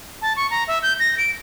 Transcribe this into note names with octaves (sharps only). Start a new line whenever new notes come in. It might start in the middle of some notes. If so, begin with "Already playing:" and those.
A5
C#6
A#5
E5
G6
A#6
D7